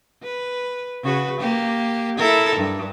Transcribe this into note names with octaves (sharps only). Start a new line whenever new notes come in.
B4
C#3 F#4 B4
A#3 G4
E4 A4 A#4
G2